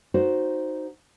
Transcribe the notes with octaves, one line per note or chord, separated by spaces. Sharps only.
D#4 F#4 C5 D5